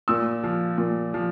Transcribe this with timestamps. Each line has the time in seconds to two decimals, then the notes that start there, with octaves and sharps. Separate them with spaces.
0.08 A#2 E6
0.44 F3
0.78 A#2
1.14 F3